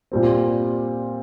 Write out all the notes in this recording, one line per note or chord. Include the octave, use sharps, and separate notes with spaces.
A#2 G3 C4